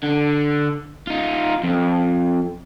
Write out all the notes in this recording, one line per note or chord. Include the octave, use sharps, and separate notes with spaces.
D3
D#4 F4
F2